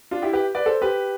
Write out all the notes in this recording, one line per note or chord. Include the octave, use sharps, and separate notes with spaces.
D4 F4
E4 G4
G4 B4
B4 D5
A4 C5
G4 B4